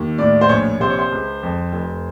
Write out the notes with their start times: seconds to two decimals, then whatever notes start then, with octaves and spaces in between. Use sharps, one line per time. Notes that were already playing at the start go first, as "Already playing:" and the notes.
Already playing: D#2 D#3
0.18 A2 D5
0.41 C5
0.49 A#1 C#5
0.80 C3 C5
0.90 C#5
0.99 C5
1.12 C#2
1.43 F2
1.72 F1